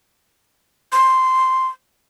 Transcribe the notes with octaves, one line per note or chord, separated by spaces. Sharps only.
C6